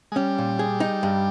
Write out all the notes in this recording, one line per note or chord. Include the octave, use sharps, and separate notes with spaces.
G#3
G3 C#4
A#2
G#4
D#4
G2